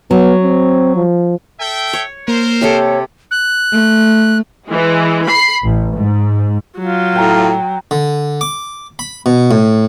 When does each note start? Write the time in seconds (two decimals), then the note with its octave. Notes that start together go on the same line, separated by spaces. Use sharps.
0.11 F#3 B3
0.43 C4
0.96 F3
1.60 A4 E5 G5
1.93 C#5
2.28 A#3 A#4 C5
2.61 C3 G4 A4 C#5
3.31 F#6
3.72 A3
4.68 E3 G#3
5.27 B5 C7
5.64 A1
5.97 G#2
6.78 F#3 F4
7.16 A2 G5 A#5
7.91 D3
8.41 D6
8.99 B5
9.26 B2
9.51 A2